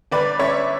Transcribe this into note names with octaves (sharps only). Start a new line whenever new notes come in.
G1 B4 D5
C#4 C#5 E5